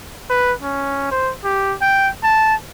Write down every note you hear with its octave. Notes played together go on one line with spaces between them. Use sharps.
B4
C#4
C5
G4
G5
A5